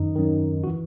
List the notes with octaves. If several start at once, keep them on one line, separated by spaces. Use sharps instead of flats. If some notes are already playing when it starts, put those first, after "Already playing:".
Already playing: F#2 D#3 D#4
F#2 D#3
F#4
E3